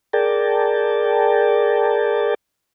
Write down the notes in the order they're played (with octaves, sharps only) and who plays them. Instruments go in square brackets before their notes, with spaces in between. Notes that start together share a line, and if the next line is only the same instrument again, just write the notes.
[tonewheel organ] G#4 A#4 D5 G5 A5